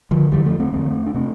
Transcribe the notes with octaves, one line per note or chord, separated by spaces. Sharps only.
D3 F3
E2 D3 E3 G3
F3 A3
A3 C4
E2 D3 A3 C4
D4
C3 A3 C4